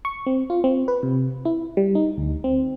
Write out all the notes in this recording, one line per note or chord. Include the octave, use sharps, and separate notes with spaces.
C#6
C4
F4
C4
B4
C3
E4
G3
D#4
D2
C4